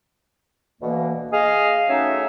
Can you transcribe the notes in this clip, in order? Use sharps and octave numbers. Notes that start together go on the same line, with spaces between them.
D2 B2 E3 A#3
G#4 D#5 F5
F#3 A3 C#4 D#4 C#5 E5